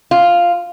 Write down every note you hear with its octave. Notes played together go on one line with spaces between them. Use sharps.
F4